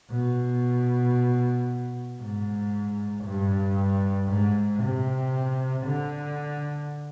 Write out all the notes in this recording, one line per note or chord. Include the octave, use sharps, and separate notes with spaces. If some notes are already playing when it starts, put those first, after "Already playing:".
B2
G#2
G2
G#2
C3
D3